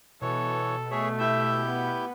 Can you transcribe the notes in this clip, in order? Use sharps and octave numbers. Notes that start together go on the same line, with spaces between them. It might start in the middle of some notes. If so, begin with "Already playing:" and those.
B2 E3 A4 C#5
A3 G#4 C#5 E5
E4 G4 E5 G6
B3 B4